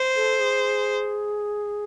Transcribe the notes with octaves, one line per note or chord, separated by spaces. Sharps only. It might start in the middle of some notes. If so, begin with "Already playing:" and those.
Already playing: C5
A4
G#4